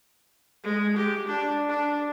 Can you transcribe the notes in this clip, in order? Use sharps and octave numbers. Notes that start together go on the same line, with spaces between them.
G#3
G4
D4
D4